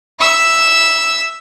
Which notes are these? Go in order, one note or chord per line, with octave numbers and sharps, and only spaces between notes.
E5 E6